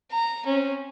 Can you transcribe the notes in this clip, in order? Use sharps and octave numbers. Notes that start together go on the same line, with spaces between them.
A#5
C4 C#4